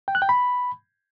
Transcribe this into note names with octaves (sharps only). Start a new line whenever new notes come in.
G5
F#6
G5
B5